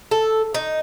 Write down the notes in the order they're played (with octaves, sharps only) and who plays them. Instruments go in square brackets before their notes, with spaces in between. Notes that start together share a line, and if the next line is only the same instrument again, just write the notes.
[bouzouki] A4
D#4